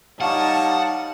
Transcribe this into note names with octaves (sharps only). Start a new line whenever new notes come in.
G3 D#4 C#5 D#5 F5 F#5 A5